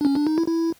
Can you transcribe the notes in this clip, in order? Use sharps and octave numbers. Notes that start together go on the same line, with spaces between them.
D4
C#4
D4
D#4
E4
E4